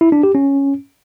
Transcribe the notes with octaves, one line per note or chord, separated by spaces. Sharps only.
E4
D4
G4
C#4